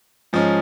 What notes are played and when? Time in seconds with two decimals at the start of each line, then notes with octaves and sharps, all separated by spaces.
0.33 G#2 F3 G#3 C#4